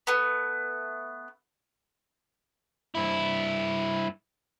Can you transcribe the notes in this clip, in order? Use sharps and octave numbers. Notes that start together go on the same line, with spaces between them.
A3 B3
G2 E4